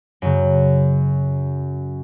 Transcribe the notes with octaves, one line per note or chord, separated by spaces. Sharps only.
F#2 C#3